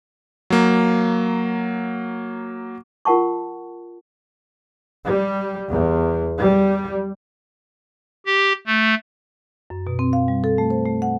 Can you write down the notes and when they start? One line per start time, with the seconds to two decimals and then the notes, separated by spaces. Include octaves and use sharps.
0.50 F#3 A#3
3.05 F4 A#4 F#5 A5 C#6
5.05 G3
5.70 E2
6.37 G3
8.26 G4
8.67 A3
9.70 F#2
9.87 B2
9.99 C4
10.13 F5
10.28 G3
10.44 A4
10.58 A3
10.70 C5
10.85 A3
11.02 F#5